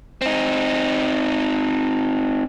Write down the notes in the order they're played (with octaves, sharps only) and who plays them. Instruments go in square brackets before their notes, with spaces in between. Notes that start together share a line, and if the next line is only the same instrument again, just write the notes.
[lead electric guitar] C4 D#4